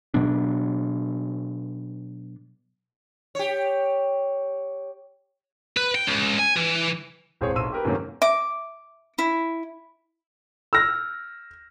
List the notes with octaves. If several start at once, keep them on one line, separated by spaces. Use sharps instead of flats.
B2 F#3 B3 D4
G4 C#5
B4
G5
C#2
G#5
E3
E1 C4 G#4 C5 C#5
B1 C6 E6 D#7
G4 A#4 B4
F#2 C3 D#3 A3 A#3 C#4
E5 D6
E4
E6 F6 A#6